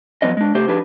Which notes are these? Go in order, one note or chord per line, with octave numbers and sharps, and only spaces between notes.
F3 F#3 B3 C#4 D#5
G#3 D4
C3 A3 G4 C5
F3 D4 G4 G#4 B4